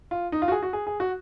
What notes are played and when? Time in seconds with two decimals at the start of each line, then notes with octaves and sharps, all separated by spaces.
0.11 F4
0.32 D#4
0.42 F4
0.48 F#4
0.52 G#4
0.62 F#4
0.73 G#4
0.87 G#4
1.00 F#4